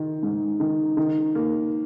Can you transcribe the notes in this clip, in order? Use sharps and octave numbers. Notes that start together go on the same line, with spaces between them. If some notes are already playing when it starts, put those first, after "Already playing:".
Already playing: D#3
G#2
D#3
D#3
A#3